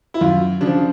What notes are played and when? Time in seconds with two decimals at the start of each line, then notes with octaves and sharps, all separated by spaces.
0.14 E4
0.21 F#2 F4
0.61 C#3 F3 D4